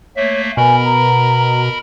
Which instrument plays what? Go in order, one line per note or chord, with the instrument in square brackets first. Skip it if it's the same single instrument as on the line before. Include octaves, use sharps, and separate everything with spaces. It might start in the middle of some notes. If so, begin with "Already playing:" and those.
[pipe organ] A3 A#3 E5 [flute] C#5
[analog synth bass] B2 [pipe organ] A#4 B5 [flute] G#5
[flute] A#5